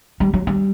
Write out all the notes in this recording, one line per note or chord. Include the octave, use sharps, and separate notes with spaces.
G3
F#3
G3